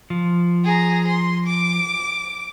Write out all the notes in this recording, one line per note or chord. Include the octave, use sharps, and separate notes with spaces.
F3
G#4 A#5
C6
D6